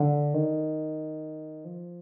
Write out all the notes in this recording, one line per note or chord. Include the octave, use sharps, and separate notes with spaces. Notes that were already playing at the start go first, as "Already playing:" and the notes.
Already playing: D3
D#3
F3